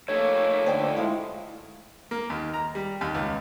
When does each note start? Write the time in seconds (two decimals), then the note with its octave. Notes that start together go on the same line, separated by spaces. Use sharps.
0.08 F2 A3 A#3 C#5
0.66 D3 C5 D5 G5
0.96 G#3 E4 F5
2.11 A#3
2.30 D#2
2.54 A#5
2.75 G3
3.01 D#2
3.14 C#2